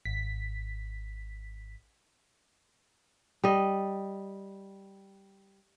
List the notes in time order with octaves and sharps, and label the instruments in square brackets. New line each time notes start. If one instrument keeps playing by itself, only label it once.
[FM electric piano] G#1 B6
[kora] G3 D#5